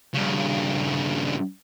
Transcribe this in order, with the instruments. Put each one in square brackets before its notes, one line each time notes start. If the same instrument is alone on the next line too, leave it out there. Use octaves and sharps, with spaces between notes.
[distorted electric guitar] G2 C#3